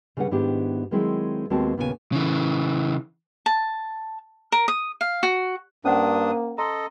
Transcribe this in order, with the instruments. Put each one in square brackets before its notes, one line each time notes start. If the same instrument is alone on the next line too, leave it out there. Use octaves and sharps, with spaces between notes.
[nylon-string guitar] C#3 G3 C#4 B4 F#5
G#2 D#3 B3 D4 E4 G4
D#3 F#3 G#3 A3 C4 E4
D#2 G#3 B3 C4 F#4 A5
D#2 A#2 C#3 B3 F#4 G#5
[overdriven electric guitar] C#3 E3
[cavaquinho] A5
A#4
D#6
F5
F#4
[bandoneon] G2 D4 D#6 [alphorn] A#3 [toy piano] C#4 C5 F#5
[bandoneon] A4 D#5 [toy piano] A#5 C6